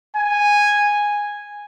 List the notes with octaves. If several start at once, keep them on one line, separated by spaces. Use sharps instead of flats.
G#5